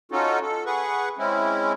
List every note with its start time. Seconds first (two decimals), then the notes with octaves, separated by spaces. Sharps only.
0.12 C#4 D#4 F4 F#4 A4
0.42 A4
0.66 G#4 B4 F#5 C#6
1.18 G#3 C4 C#4 E4